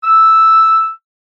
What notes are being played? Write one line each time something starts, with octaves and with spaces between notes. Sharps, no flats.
E6